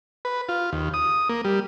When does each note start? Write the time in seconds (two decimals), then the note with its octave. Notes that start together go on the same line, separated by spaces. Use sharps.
0.25 B4
0.49 F4
0.72 D#2
0.94 D#6
1.29 A#3
1.45 G3